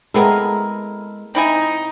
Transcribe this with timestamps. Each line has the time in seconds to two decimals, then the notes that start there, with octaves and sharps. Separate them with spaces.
0.14 G#3 B3 C4 E4 A4 A#4
1.35 C4 D#4 E4 G#5